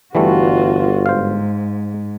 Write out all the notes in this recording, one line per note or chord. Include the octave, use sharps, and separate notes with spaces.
G1 E3 G3 A3 F4 F#4
G#2 C5 F5